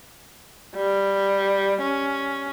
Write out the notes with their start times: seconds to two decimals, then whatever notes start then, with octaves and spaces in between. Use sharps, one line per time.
0.76 G3
1.81 C#4